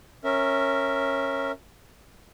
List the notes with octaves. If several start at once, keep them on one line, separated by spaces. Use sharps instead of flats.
C#4 A#4 E5